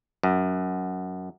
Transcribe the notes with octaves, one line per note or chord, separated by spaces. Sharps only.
F#2